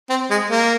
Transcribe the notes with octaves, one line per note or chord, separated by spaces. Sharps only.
C4
G#3
A#3